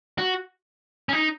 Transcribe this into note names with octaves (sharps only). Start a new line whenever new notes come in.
F#4
C#4
D#4